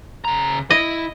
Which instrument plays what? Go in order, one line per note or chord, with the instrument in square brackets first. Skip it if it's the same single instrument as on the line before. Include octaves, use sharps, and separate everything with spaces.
[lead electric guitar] C#3 A#5
[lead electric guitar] E4 [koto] D#5